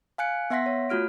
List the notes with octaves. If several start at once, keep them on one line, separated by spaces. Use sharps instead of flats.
F5 G#5 F#6 C#7
B3 E5 F#5 C6 A#6 B6
C#5
A3 F4 F#4 F6 D7